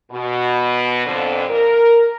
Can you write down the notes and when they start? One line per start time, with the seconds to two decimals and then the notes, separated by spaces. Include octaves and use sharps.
0.12 B2
1.06 F2 G#2 D3
1.49 A#4